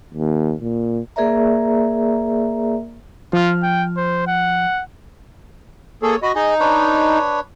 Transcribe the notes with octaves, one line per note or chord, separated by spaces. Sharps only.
D#2
A#2
A#3 G#4 A#4 D5 E5 A#5
F3 F4 F6
G5
C5
F#5
A#3 G#4 A4 C#5
F#4 D#5 B5
D#4 G#4 D#5
D4 B4 C#5